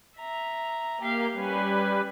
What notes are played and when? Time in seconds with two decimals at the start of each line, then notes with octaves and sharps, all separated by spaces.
0.17 E5 A#5
1.01 A#3 G4 F5
1.35 G3 C#4 B4 G#5